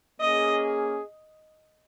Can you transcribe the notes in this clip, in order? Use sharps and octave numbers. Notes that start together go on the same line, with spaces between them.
A#3 C#4 G#4 D#5